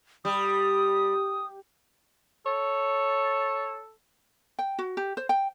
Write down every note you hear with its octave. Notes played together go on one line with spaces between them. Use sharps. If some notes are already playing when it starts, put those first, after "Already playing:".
G3 D#6
A4 C#5
G5
F#4
G4
C5
G5